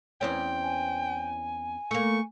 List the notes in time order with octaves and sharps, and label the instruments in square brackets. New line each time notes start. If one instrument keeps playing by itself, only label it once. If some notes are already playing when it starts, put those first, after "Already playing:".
[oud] E2 C4 C#4 [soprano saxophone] G5
[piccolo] G#5
[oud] A3 A#3 [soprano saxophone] C#6